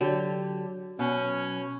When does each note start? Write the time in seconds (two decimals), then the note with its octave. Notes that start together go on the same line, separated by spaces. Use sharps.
0.01 D3 F#3 G4
0.99 B2 C#4